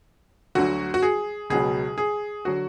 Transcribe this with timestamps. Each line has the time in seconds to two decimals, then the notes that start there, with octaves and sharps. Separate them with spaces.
0.55 D2 D3 F#3 F#4
0.94 F#4
1.02 G#4
1.50 C#2 B2 F#3 G#4
1.98 G#4
2.45 D3 F#3 F#4